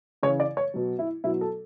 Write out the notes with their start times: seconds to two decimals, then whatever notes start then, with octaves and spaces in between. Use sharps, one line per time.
0.23 C#3 E3 C#5
0.40 D5
0.57 C#5
0.74 B2 F#3
0.99 E4
1.24 B2 F#3 E4
1.41 A4